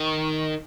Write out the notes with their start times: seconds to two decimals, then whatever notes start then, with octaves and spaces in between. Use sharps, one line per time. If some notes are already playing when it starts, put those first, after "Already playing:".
Already playing: D#3